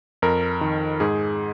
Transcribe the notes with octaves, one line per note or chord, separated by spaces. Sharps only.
F2 A#4
D#3
G#2 G#4